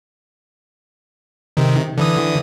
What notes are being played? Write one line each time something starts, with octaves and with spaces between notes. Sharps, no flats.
C3 D#3
D3 E3 D#6